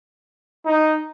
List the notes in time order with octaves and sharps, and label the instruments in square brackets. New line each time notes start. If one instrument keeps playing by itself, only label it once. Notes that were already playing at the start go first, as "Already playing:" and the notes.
[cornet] D#4